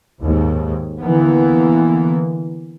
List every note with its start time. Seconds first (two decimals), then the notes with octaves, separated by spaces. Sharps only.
0.21 D#2 G#2
1.00 D3 E3 A#3 B3